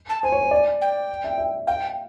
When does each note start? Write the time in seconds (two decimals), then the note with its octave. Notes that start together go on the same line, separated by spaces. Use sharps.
0.09 A5
0.23 C5 G#5
0.32 C#5
0.42 C5
0.51 D5
0.81 G5
1.24 E5
1.38 E5
1.67 F5 G5